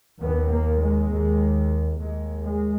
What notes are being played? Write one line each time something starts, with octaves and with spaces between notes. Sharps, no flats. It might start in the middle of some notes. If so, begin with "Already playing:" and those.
D#2 B3
A#3
G#3
D#2
D#2 G#3
G#3